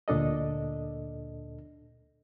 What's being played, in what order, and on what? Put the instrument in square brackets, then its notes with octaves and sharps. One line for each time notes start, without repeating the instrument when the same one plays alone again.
[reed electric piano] D2 A#2 D4 A4 D#5